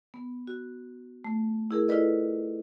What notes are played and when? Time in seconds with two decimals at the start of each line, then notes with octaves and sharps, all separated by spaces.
0.14 B3
0.47 F#4
1.25 A3
1.71 E4 G#4 A#4
1.88 E4 F4 A4 B4 D5 D#5